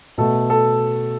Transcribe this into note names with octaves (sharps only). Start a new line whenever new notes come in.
B2 A3 A4
A4